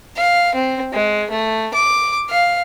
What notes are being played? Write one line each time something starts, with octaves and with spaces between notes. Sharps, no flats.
F5
C4
G#3
A3
D6
F5